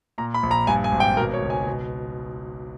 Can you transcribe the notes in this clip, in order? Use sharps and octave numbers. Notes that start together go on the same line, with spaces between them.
A#2 A#5
B5
A#1
A#5
G2 G#5
G#5
G#1
G5
B2 A#4
C#5
C#2
G#5
B2